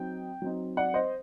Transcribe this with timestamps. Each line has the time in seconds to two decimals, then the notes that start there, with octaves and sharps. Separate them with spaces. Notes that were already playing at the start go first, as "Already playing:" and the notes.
Already playing: F#3 C4 D#4 G5
0.42 F#3 C4 D#4
0.77 D5 F#5
0.94 C5 D#5